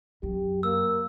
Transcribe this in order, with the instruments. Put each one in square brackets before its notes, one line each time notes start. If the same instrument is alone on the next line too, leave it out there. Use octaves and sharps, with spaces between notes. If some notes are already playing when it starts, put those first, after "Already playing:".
[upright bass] F#2 [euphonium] G4
[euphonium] A#3 [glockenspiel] E6